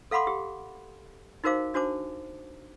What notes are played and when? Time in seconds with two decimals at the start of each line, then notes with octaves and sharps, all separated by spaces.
0.11 A4 F5 F#5 B5 C6 D6
0.27 G4
1.44 D#4 F#4 A#4 C5 F5 D6
1.74 D4 F#4 C5 A5 D6